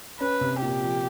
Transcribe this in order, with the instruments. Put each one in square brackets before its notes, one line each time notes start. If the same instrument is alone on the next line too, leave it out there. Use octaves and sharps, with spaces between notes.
[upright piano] C#4 [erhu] B4
[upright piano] C3
[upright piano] A#2 [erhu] G4
[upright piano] F3